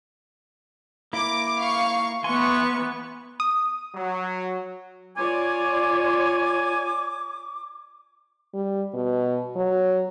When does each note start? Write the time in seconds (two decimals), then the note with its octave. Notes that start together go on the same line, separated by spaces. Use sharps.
1.13 A#3 E4 D6
1.60 F5 C#6
2.24 E3 B3 G#5 C6 C#6
3.40 D#6
3.95 F#3
5.17 F4 C#5 D5 G#5 D6
8.54 G3
8.94 B2
9.56 F#3